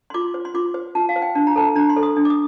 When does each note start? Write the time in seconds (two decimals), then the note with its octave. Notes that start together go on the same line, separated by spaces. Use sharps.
0.10 C6
0.14 F4 D6
0.34 C5
0.45 C6
0.54 F4 D6
0.74 C5
0.95 F4 A5
1.09 F5
1.16 C5
1.22 G5
1.35 D4 A5
1.47 A#5
1.56 A4 C5 A5
1.75 D4 A#5
1.89 C6
1.97 A4 C5
2.03 D#6
2.16 D4
2.25 D6
2.30 D#6